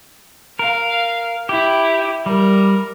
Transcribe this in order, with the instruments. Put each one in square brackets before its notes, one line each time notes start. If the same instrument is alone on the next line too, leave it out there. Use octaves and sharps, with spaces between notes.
[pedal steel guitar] A#4 [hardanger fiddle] F5
[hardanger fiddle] E4 [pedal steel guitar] G4
[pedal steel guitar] G3 [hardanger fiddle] A#4